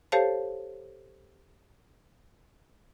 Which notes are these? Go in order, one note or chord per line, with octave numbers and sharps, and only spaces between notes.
G4 A4 C5 C#5 F5 A5